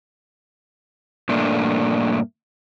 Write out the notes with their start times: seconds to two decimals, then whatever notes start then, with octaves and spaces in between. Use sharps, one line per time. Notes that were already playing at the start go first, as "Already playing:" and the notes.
1.29 G2 A#2 A3 A#3 D4